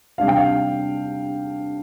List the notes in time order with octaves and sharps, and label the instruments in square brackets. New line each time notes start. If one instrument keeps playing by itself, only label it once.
[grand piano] C3 G3 D4 F5
G5
F5